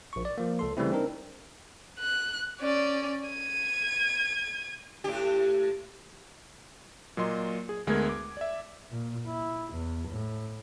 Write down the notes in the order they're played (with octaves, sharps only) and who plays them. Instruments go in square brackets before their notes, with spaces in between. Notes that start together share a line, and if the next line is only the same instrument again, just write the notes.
[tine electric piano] A#1 C#6
D5
F3 A#3
C#2 A4 C6
C#3 E3 G3 A3 C4 E4
C4 D4 D#4 A#4
[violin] F#6
C#4 D5
G#6 D#7
[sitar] A2 G4
[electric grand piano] A#2 F#3 A#3 D#5 C6
G#4
D2 G#3 A3 B3 A#4 G#6
D6
D5 E5
[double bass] A#2
E4
E2
A2